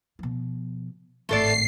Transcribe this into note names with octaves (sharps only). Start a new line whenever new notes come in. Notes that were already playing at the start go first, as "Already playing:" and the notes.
B2 F3
G#1 A2 A3 A4 D5 C7